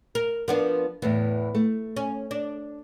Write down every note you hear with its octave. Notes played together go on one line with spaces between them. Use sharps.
A#4
F3 B3 D4 A#4 F#5
E2 A2 E3 B3
A3
C#4
D4